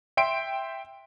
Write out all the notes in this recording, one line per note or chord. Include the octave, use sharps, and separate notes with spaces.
E5 G5 C6 D7